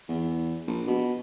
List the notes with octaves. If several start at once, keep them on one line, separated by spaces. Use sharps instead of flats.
E2
A#1
B2